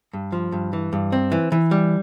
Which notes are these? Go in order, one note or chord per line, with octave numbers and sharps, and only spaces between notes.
G2
F3
G2
E3
G2
C4
E3
E3
G3